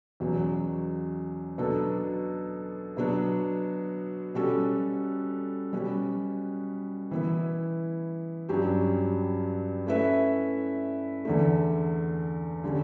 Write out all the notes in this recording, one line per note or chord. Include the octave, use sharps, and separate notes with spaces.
E2 B2 F#3 C#4
B2 F#3 B3 D4 A4
B2 F#3 B3 D4
B2 G3 C#4 F#4 A4
B2 G3 C#4 F#4
E3 B3 E4
G2 F#3 C#4 G4
A3 C#4 E4 B4 E5
E2 D3 A3
D3 G3 C#4